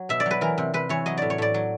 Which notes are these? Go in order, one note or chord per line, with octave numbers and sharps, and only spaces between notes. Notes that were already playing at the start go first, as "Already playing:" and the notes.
Already playing: F#3
B2 E5
D5
F#3 B4
E3 A#4
C3
C3 B4
E3 C#5
F#3 D#5
A2 D5
C#5
A2 D5
F#3